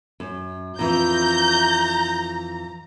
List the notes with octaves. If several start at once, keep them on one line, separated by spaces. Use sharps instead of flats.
F#2
F2 E3 A#5 G6